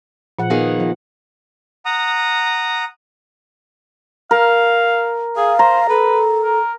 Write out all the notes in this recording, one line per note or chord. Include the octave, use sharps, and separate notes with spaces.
A#2 F3 F#5
D#3 A#3 B3 G#4
F3
F#5 A#5 D#6
A#4 F5
G#4 F5
C5 A#5
A4 B4
A#4